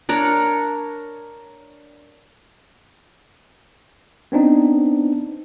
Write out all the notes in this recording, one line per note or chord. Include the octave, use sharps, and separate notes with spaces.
D4 A#4 C#5
B3 C4 D4 D#4